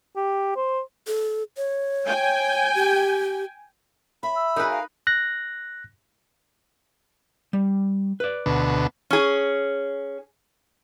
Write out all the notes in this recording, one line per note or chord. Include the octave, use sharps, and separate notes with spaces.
G4
C5
A4
C#5
G5 G#5
G4
E5 B5
E6
D#4 F#4 G#4 A#4 B4
F5
F#6 A#6
G3
B4 D5
D2 B2
C#4 G#4